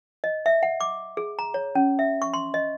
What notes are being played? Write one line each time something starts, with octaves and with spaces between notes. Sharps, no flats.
D#5
E5
F#5
D6
G#4
A#5
C#5
C#4
E5
C#6
C6
D#5